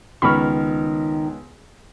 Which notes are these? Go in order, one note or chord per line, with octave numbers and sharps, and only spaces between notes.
C#2 D#3 B3 B5 C#6 F6